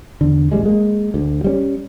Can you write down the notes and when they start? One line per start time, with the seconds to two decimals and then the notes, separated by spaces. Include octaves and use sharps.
0.21 E2 D3
0.52 D#1 A1 G3 G#3
0.65 G#3 A#3
1.14 D2
1.44 G3 C4 C#4